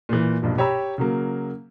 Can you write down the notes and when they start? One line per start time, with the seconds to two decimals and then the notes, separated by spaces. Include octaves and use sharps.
0.09 A#2 E3
0.42 B1 G2 A#2 F3
0.58 G4 C#5 G5 A#5 B5 E6
0.98 C#3 F#3 A#3